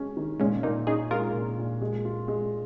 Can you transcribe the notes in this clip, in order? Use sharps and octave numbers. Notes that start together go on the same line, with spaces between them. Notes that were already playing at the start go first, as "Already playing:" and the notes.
Already playing: G#3 C#4
D#3
A#2 G#3 C#4
A#2 A#3 D#4
C#4 D#4 G#4
G#3 F4 A#4
A#2
A#2
G#3
F4
G#3